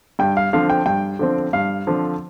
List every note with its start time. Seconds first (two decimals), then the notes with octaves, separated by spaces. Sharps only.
0.19 G2 G5
0.37 F5
0.53 D3 F3 C4 F5
0.70 G5
0.86 G2 G5
1.19 D3 F3 C4
1.53 G2 F5
1.87 D3 F3 C4